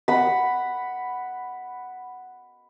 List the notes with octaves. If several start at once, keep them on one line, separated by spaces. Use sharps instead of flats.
F#5 B5